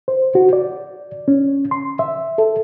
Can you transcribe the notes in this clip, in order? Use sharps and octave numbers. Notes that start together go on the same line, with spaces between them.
C5
F#4
D5
C#4
C6
E5
A4